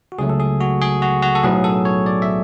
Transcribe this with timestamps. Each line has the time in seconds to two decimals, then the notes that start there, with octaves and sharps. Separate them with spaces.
0.12 F#4
0.18 C#2 C#3 F#3 A3 G#4
0.29 A4
0.40 G#4
0.60 F#4
0.82 G#4
1.02 F#4
1.22 F#4
1.35 A4
1.43 B1 A2 F#3 B3 G#4
1.64 A4
1.85 C#5
2.06 D5
2.22 E5